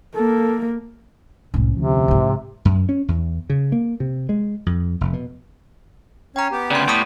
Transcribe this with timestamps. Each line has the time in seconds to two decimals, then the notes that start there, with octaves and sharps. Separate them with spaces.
0.16 A#3 A4
1.54 C2 F2 A2 C#4
1.77 D2 C3 F3
2.08 G#2 E3
2.65 F#2
2.89 C#4
3.08 E2
3.50 C#3
3.72 A#3
4.00 C3
4.29 G#3
4.66 F2
5.01 F1
5.13 B2
6.36 C#4 C#5 G5 A#5
6.52 B3 G4
6.71 D2 C#3 D5 C6
6.88 A2 C#6 D#6 B6